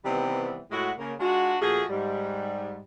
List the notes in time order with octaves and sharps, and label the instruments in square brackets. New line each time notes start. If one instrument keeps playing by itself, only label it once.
[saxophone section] C3 D#3 E3 G3 B3 C4
A2 G#3 E4 F#4
C#3 A#3
G#3 D4 F4 F#4
A#2 F3 A3 F#4 G#4
G#2 G3